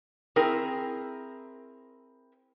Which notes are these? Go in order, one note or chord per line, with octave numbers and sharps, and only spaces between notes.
C4 E4 G#4 A#4